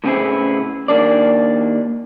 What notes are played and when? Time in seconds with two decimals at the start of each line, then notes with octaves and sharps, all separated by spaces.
0.04 A2 C#3 B3 C4 E4 G#4
0.88 D#2 A#3 D4 D5